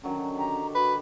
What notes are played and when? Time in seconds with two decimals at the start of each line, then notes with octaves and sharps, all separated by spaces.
0.04 D3 D#3 F#3 C#4
0.37 G4 A#5
0.75 F#4 B4 B5